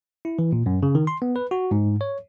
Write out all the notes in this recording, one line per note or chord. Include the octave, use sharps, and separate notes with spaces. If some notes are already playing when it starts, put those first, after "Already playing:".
E4
E3
A#2
F#2
C#3
D#3
C6
B3
B4
F#4
G#2
C#5